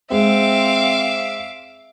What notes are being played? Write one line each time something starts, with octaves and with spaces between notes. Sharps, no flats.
G#3 C4 E5 F5 D6